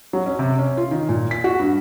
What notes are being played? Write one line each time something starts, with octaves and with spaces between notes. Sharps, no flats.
F#3
C#4
C3
C#4
F4
D#3
A#2
B6
F#4
G2